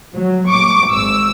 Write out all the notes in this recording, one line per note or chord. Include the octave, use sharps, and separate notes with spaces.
F#3
C#6 D6
G#1 E6